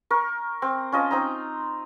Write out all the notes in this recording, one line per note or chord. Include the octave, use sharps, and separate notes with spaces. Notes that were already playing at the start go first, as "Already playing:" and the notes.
A#4 C#6
C4
C#4 F4 D#5 A5
C4 D#4 A#5